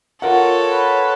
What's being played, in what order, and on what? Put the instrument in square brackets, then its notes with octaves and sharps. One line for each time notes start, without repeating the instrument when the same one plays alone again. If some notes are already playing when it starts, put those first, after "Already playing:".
[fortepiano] F4 A#4 F#5 [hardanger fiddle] A4 C#5
[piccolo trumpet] B4